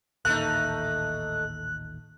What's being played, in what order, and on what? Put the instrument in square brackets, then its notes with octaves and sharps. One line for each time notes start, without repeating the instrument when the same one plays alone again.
[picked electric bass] A1 D#2 A#2 [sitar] A3 D#4 [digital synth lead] F#6